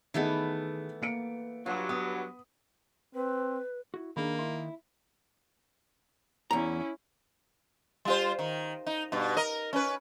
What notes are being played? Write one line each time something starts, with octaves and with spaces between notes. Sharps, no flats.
D#3 E3 A3 B3 G#4 D#5
A#3 C#7 D7
G2 F#3 F4
B3 D#6
C4 B4
E4 F#4
D#3 A#3 D4 G#4 B5
E4 C6
E2 C#4 E4 A#5
G3 F4 C5
D#3
D#4
G2 B2
A#4 D#5
C#4 B4